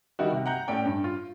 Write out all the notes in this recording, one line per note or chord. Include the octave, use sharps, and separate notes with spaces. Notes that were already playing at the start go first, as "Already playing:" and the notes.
D#3 G3 D#4 E4 F#4
C3
F#5 A#5 G6
A2 C#4 D5 G5
G2
F4